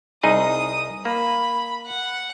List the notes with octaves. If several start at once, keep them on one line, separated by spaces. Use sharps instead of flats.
C2 D#4 G#4 D#6
A#3 B5
F#5